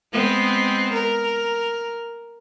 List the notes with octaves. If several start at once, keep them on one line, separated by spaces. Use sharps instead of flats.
G#3 B3 C4
A#4